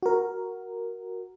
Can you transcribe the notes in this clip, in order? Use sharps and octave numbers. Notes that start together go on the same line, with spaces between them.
F#4 A#4